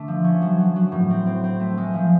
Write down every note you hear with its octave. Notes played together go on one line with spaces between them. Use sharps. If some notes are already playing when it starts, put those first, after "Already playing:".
Already playing: D3 A3 D4
F3
C#4
F#3
F#3
F#3
A2
C4
C4
C4
A3
G#3
F3